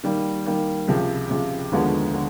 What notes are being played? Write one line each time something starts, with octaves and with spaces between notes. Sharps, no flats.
D#3 G3 A#3
D#3 G3 A#3
C#2 C3 F3
C#2 C3 F3
D#2 D3 F3 G#3 B3
D3